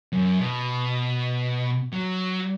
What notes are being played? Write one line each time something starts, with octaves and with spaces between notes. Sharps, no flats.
F#2
B2
F#3